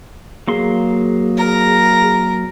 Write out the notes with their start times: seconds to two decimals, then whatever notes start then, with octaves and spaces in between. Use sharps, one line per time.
0.48 F#3 A#3 G#4 C6
1.38 A#4 A#5